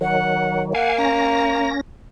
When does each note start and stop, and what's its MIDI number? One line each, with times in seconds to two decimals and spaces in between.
0.01 0.73 51
0.01 0.73 54
0.01 0.62 78
0.75 1.75 58
0.75 0.98 77
0.75 0.92 78
0.75 0.98 80
0.98 1.81 61
0.98 1.69 82
0.98 1.81 94